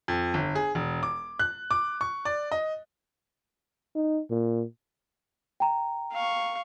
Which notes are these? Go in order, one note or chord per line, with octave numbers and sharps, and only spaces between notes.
F2
G1
G#4
E1
D6
F#6
D6
C#6
D5
D#5
D#4
A#2
G5 A#5
F5 C#6